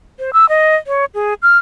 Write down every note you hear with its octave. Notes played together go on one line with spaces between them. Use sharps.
C5
E6
D#5
C#5
G#4
F6